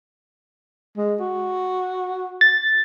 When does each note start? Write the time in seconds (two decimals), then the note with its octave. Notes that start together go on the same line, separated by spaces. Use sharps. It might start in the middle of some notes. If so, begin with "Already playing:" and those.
0.97 G#3
1.20 F#4
2.41 A6